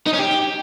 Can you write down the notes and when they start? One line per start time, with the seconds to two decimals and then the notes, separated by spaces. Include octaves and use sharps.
0.07 D#4
0.13 C#4
0.19 G4